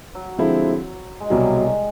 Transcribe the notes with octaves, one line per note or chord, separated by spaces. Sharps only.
F#3
D3 F3 G#3 C4 E4
G#3
C2 B2 F#3 G3
G#3